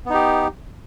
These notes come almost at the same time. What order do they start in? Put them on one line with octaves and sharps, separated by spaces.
B3 D#4 G4